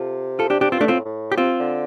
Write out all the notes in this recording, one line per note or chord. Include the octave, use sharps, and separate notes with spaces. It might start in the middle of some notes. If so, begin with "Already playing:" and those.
Already playing: C3 F4 A4
F4 A4
D4 G4
D4 G4
G2 C4 F4
A3 D4
A2 C4 F4
A2
G4
C3 C4 F4
D3